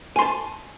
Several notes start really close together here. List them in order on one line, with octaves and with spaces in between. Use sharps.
G#5 C6 A5